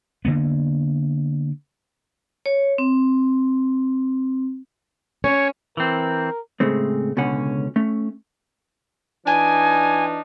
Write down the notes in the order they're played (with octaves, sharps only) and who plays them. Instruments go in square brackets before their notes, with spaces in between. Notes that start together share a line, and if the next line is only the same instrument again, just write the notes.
[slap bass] D3 D#3 A#3 B3
[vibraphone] C#5
C4
[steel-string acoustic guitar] C#4 [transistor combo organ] C#5
[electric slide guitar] E3 C4 [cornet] A#4
[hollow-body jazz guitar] A2 C#3 G#3 A3 C4
C#2 B2 D3 C#4 F#5
A3 C#4
[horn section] E3 D4 D#4 [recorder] G#5